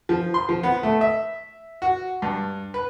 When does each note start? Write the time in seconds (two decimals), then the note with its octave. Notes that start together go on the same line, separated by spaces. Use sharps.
0.09 F3
0.34 C6
0.49 F3
0.63 B3
0.83 A3
1.01 E5
1.82 F#4
2.22 G2
2.74 B4